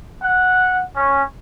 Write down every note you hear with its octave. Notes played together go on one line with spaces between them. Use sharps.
F#5
C#4